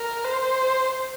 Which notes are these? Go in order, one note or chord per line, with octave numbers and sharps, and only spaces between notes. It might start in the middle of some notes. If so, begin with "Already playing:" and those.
Already playing: A#4
C5